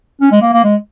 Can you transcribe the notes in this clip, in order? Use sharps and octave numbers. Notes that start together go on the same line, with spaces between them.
C#4
G#3
A#3
A#3
G#3